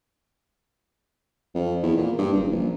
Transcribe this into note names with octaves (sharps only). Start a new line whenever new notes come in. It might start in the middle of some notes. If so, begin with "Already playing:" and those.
F2
E2
A#2
G2
F#1
A#1